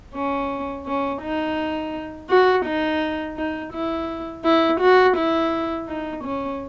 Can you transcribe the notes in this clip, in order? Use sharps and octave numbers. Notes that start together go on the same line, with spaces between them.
C#4
C#4
D#4
F#4
D#4
D#4
E4
E4
F#4
E4
D#4
C#4